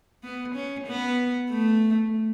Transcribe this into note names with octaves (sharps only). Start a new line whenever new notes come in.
B3
C#4
B3
A3